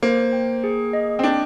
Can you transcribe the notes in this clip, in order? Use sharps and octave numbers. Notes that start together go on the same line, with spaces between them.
A#3 C5
G5
G#4
D#5
C4
D4 G5